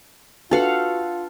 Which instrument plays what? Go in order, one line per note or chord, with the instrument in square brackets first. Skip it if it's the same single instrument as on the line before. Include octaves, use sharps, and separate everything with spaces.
[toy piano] D4 B4 [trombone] F4 [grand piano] F#4 [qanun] A4 F5 F#5